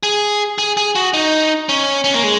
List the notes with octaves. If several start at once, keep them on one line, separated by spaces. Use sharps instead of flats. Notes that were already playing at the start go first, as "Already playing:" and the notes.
G#4
G#4
G#4
F#4
D#4
C#4
C#4
A#3
G#3